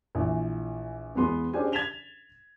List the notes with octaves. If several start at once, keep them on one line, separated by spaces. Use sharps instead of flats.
A#1 E3
E2 G#3 B3 C6
C#4 D4 G4 G#4 C5 G#5
G#6 A6 B6 E7 F7 G7